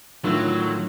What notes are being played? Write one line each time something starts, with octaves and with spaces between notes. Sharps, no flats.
A2 D3 D#3 F#3 F4 E6